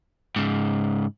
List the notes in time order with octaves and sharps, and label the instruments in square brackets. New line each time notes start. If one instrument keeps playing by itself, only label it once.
[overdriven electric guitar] G#2 C#3